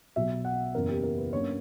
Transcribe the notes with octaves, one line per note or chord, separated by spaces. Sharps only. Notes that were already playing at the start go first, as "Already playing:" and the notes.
B1 B2 F#3 E5
F#5
F#1 E2 C#3 A#4
G4
A#4
B4
G1 F#2 D3 A#3 C#4 C#5